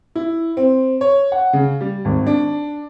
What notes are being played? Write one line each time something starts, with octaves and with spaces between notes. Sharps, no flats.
E4
C4
C#5
F#5
C#3
G3
G#1
D4